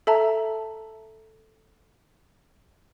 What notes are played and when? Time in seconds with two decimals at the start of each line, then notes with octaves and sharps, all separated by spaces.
0.07 A4 E5 A5 A#5